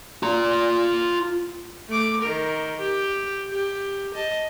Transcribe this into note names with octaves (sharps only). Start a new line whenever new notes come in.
F4 A#5
A3 D6
D#3 A#4
G4
G4
D#5 A5